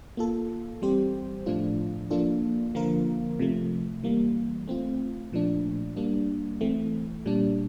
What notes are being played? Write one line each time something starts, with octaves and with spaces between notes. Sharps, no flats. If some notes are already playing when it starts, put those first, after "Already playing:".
A#3 F4 A4
E3 G3 C4 G4 C5
A2 F3 A3 D4 F4
F3 A#3 D4 F4 A4
D3 F3 A#3 F4 A#4
C3 F3 A3
E3 G3 A#3
A3 C4 F4
A#2 F3 A3 D4
G3 A#3 D4
E3 A3 C4
A#2 G3 D4